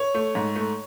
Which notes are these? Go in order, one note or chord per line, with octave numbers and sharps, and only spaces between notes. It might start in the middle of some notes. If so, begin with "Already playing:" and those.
Already playing: C#5
A3
G#2
A3